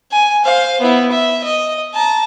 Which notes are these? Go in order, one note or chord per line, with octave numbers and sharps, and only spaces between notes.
G#5
C5 F5
B3 E4
E5
D#5
A5 A#5